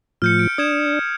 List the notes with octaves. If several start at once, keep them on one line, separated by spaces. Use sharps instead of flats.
A2 F3 F6 G6 C#7
D7
D4 D#6 G#6 E7